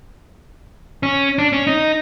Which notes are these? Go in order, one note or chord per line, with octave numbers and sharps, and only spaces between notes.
C#4
D4
C#4
D#4